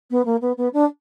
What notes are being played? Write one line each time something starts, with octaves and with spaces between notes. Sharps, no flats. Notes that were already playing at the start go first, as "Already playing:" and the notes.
B3
A#3
B3
B3
D4